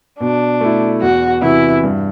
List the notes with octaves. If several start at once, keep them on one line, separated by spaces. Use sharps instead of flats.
B2 D4
A3 E4
E2 F#4
C3 E3 B3 E4 F#4
G2